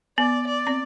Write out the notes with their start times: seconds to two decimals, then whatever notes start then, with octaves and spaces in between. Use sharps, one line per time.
0.18 B3 D5
0.47 D5
0.67 C4